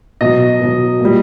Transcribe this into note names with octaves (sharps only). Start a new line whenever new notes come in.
B2 F#3 D#5
B2 F#3
A#2 G3